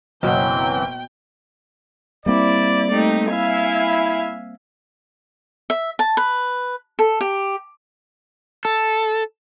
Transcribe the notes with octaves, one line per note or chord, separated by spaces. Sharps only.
F#1 B2 E3 F#3 C4 F#5 G5
G3 A#3 C4 E4 D5
A3 D#4 G4
E4 E5 F5 G#5
E5
A5
B4
A4
G4
A4